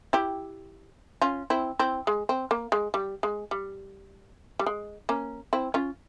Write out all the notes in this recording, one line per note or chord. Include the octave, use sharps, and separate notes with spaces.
E4 G4
C#4 F4
C4 E4
C4 E4
G#3
C4
A#3
G#3
G3
G#3
G3
G3
G#3
A#3 C#4
C4 E4
C#4 F4